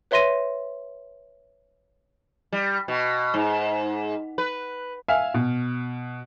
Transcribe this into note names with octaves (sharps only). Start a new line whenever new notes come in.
B4 C#5 E5 C6 A#6 D#7
G3
B2
G#2
B4
E5 F5 G#5 F6
B2